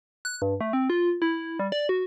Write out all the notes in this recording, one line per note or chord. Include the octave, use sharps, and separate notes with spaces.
F#6
G2
A3
C4
F4
E4
G3
D5
F#4